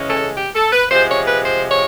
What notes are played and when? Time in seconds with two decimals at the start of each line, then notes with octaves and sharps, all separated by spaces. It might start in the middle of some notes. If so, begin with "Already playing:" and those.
Already playing: C#3 E3 G#3 C#4
0.10 A4
0.37 G4
0.55 A4
0.72 B4
0.90 C3 F3 G#3 C5
1.09 C#5
1.27 B4
1.45 C5
1.71 C#5